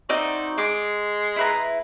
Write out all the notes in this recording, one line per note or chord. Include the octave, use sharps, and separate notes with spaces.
C4 D#4 F#4 D5
G#3 D6
E4 B4 A#5